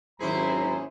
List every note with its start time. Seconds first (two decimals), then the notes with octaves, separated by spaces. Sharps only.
0.20 G#1 D#2 F#3 C#4 E4 G#4 C5 A#5